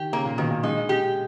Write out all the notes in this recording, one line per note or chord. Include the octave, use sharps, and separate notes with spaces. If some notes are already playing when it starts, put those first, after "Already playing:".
Already playing: D#3 G4
C#3 A#3
A#2
B2 D#3
A#2
G#3 D#4
G4